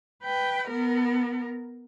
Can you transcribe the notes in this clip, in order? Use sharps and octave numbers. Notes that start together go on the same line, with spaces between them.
B4 G5
B3 A#4